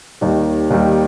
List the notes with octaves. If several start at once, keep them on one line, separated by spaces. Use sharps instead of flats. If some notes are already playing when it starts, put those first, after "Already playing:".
D#2 D#3 G3
D#2 D#3 G3